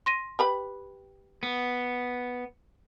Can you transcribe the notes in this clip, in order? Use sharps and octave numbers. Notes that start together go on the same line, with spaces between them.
C6 A#6 D#7
G4 B4 B5
B3